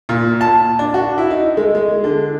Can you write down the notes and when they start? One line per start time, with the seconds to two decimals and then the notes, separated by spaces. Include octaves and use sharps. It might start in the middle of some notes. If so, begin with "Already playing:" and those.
0.09 A#2
0.41 A5
0.79 D4
0.94 F#4
1.18 E4
1.30 D#4
1.57 G#3
1.75 G#3
2.04 D3